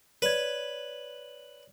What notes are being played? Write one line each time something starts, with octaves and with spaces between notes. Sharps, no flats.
B4 C#5 D5 G#6